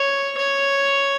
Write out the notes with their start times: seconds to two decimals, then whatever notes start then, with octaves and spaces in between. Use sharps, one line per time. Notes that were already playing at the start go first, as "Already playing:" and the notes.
Already playing: C#5
0.37 C#5